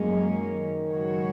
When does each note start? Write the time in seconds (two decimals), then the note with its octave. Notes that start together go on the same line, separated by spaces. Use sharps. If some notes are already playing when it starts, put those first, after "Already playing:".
Already playing: F#2 F#3 G#3 A#3 C#4
0.32 D#3
0.88 F#2 C#3 G#3 F#4 C#5